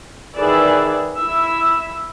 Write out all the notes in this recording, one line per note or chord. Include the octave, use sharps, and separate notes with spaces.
D#3 E3 G#4 B4 D5 E5
E4 E5